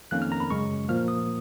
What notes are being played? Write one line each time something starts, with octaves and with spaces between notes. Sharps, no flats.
F2 D#3 A#3 C#4 F#6
F6
A#5
B5
F#2 C#3 G#3 C#6
A#2 F3 A#3 F6
D#6